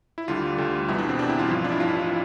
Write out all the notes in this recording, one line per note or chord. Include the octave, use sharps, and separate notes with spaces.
E4
D2 D3 G3 F4
D2 D3 G3
E2 B2 G3 E4
D4
C4
E2 B2 G3 D4
E4
F4
A1 G2 F3
D4
E4
A1 G2 F3 F4
E4